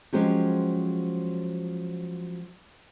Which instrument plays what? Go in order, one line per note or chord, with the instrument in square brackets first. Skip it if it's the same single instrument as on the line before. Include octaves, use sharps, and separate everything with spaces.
[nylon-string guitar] F3 F#3 G#3 C#4 G4 C5